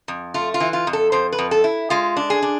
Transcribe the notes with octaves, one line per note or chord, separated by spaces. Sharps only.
F2
A3 F4
F4
E3
F4
F2
A4
F2 C5
B4
F2
A4
E4
G#3 F4
D4
G#4
D4